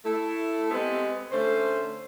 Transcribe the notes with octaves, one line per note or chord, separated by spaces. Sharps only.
A3 E4
G#3 B3 C4 G4 B4
D3 A3 C#4 C5